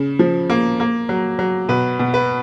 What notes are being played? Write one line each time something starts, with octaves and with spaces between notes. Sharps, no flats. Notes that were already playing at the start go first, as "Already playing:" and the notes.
Already playing: C#3
F3
A#3
A#3
F#3
F#3
B2 B4
B2
B4